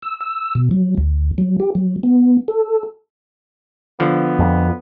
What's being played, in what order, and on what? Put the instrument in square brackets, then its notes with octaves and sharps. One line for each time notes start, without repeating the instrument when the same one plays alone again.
[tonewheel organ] E6
E6
B2
F#3
D2
F#3
G4
F#3
B3
A4
[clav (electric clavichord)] D3 F3 [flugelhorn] B3
[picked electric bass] F2